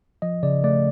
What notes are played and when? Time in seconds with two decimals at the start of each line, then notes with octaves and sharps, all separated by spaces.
0.22 F3 D#5
0.43 C#3 D5
0.64 A3 D5